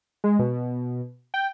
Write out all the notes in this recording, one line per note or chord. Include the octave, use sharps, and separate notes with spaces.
G#3
B2
G5